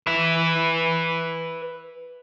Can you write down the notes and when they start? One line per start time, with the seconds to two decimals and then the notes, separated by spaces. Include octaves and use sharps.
0.07 B4 E5